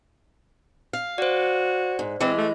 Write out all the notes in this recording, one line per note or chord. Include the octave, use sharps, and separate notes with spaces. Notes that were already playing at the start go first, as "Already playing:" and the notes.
F5
F#4 C5 D5
G#2
E3 G#3 C4
A3